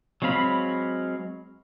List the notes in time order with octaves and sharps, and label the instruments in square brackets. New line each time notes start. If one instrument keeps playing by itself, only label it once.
[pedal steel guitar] F#3 G#3 C4 F5 B5